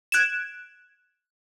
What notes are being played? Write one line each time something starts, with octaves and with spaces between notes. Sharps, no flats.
F#6 G#6 D7 E7